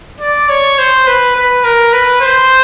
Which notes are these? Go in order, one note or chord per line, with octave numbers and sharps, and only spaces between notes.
D5
C#5
C5
B4
B4
A#4
B4
C5